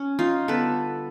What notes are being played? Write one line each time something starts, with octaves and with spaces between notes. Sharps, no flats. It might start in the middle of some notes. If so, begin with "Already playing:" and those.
Already playing: C#4
D#4 F4
D3 G3 B3 A4 B4